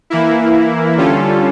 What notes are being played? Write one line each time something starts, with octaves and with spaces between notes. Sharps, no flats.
E3 A#3 E4
D3 G3 C#4 F4 A4